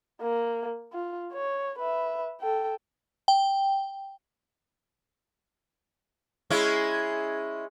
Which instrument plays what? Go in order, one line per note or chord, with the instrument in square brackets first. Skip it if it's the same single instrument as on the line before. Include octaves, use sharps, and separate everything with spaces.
[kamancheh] A#3
F4
C#5
B4 E5
A4 G5
[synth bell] G5
[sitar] G#3 C#4 E4